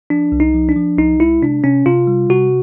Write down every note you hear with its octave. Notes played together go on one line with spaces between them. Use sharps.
F3 D4
C2
D#4
F3
D4
F3
C2 D#4
G#3 E4
C3 D4
C3 C#4
C3 F4
G3
C3 F#4